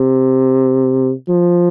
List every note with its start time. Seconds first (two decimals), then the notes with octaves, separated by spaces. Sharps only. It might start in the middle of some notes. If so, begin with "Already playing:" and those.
Already playing: C3
1.28 F3